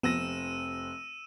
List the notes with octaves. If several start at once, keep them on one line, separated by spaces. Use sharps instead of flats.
F1 F3 B3 C4 E6 A#6 D#7 E7